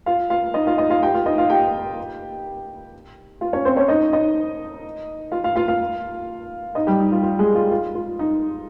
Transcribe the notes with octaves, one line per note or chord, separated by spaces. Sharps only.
F4 F5
F4 F5
D#4 D#5
F4 F5
D#4 D#5
F4 F5
G4 G5
F4 F5
D#4 D#5
F4 F5
G4 G5
F4 F5
C#4 C#5
C4 C5
C#4 C#5
D#4 D#5
D#4 D#5
F4 F5
F4 F5
F4 F5
F4 F5
D#4 D#5
G3 G4
D#4
F4
F4
G#3 G#4
F4
F4
F4
D#4